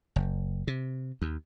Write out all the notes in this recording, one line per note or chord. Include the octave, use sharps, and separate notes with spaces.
F#1
C3
D#2